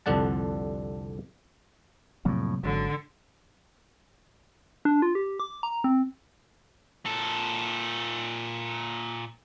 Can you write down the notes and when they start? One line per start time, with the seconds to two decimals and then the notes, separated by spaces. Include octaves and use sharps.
0.06 C2 F2 D3 D4 F#5 A5
2.25 F2 A2 C3 F#3 A#3
2.63 G#1 G#2 D3 F#3
4.85 D4
5.02 F4
5.15 G4
5.40 D6
5.63 A#5
5.84 C4
7.05 A#2 A4